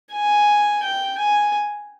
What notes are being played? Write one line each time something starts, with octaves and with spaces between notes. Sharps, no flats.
G#5
G5
G#5